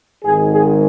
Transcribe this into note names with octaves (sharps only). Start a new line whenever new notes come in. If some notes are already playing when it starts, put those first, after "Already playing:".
G#1 G#2 D#3 G#4
G#4